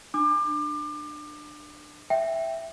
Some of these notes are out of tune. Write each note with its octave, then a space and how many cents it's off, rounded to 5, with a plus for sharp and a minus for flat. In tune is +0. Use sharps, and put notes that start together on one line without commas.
D4 +25 D6 +30
E5 +0 G5 +0